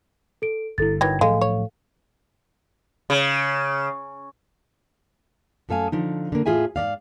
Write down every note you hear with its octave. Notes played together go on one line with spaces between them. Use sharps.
A4 D7
G1 G2 E4 A4 A6
D#3 E3 F#3 G5 G#6 A#6
A2 F3 F#3 G#3 A4 F5
C#5
C#3
F#2 A3 A4 F5 G#5
D3 F3 D#4
D3 A#3
A2 F4 G#4 E5 G#5
G#2 C3 D5 F5